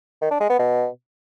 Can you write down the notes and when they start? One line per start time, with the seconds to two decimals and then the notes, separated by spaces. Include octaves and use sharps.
0.22 D#3
0.31 D4
0.40 G#3
0.50 B3
0.59 B2